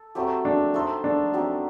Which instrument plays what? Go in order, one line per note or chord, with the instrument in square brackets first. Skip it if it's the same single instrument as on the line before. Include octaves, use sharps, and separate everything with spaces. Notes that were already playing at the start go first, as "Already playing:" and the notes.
Already playing: [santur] A4
F#3 A3 C4 G4
[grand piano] D4
[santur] A3 D#4 A4 C5
[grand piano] D4
[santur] F#3 C4 D#4 G4